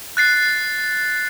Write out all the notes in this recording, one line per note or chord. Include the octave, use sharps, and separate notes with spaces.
F#6 A6 C7